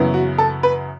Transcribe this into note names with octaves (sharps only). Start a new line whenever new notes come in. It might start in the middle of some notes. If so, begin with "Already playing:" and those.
Already playing: F#2 C#3 E3 B3
F#4
A4
B4